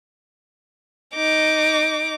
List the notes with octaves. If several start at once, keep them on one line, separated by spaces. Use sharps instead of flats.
D#4 D6